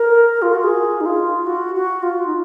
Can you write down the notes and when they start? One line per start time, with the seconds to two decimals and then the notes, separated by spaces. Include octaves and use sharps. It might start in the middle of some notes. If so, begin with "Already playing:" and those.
Already playing: A#4
0.42 F4
0.53 F#4
0.64 G#4
1.01 D#4
1.06 F4
1.47 F#4
1.75 F#4
2.03 F4
2.27 D#4